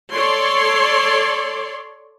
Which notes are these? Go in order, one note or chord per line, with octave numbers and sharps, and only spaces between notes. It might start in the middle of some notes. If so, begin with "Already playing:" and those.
A4 C#5 D5 C6